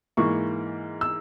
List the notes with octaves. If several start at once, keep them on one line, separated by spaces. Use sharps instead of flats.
G#2 E3 A#3 C#6
E6